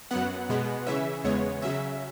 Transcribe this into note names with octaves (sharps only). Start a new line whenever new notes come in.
F#2 F#3 B3 F#5
B2 G#3 B3
C#3 E3 C#4 E5
E2 C#3 G#3 B3 C#5
C#3 F#3 C#4 E5